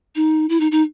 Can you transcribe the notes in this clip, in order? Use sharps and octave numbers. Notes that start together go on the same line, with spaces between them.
D#4
E4
D#4
D#4